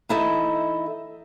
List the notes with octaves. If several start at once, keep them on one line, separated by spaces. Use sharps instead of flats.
E3 D#4 E4 A4 D#5 E5